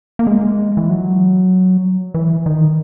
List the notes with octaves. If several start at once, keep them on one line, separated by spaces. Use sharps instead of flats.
A#3
G#3
E3
F#3
E3
D#3